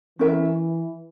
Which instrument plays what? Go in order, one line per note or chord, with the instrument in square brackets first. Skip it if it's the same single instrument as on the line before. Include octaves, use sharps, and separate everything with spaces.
[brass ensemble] E3 [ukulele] C#4 E4 A#4 E5